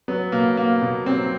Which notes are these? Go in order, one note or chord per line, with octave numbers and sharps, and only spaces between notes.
F#3 B3
B2 A#3
A#3
B2
F#3 C4